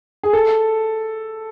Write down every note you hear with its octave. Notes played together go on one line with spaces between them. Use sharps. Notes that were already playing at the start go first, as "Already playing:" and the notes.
G#4
A4